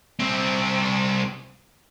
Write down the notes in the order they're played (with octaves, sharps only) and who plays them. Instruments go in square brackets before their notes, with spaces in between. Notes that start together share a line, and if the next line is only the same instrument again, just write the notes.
[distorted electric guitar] C2 C4